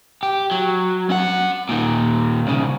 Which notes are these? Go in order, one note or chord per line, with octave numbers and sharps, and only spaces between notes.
G4
F#3
C#4 F#5
A#2 D#3
C2 C#3